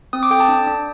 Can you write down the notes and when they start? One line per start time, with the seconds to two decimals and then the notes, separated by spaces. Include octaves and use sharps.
0.13 C4 D#6
0.23 D6
0.31 A4 G5
0.40 A5
0.49 D4
0.67 D4